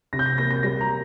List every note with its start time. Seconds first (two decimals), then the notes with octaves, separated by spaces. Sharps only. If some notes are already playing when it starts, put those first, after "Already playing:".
0.13 C3 A#6
0.19 G6
0.26 A#6
0.38 A#3 A#6
0.51 A#6
0.63 G3 A#6
0.81 A#5